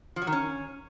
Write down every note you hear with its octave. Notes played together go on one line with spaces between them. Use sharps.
F3
F#3
D#3
C#4